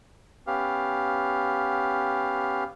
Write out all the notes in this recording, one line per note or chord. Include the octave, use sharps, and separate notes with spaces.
B3 C#4 G4 F5